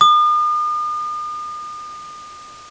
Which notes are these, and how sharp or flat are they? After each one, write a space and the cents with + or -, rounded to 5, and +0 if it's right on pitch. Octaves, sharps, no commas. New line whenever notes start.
D#6 -45